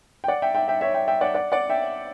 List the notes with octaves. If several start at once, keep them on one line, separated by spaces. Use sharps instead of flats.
G5
D5 F#5
E5 G5
E5 G5
E5 G5
C#5 E5
E5 G5
E5 G5
D5 F#5
D5 F#5
D5 F#5
E5 G5